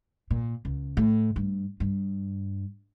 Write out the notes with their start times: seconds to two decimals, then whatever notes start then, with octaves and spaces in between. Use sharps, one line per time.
0.31 A#2
0.65 C#2
0.97 A2
1.36 G2
1.80 G2